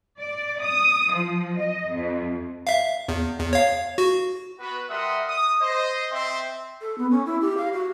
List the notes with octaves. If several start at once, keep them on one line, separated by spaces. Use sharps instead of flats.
D5
D#6
F3
D#5
F2
E5 F5
E2
E2
C#5 F5
F#4
B3 F#4 B4
G3 A#4 E5 F#5 C6 D#6
D#6
C5 D#5
C4 E5 C6
A4
B3
C#4
E4
G4
F5
F#4